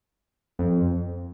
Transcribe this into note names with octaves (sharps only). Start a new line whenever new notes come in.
F2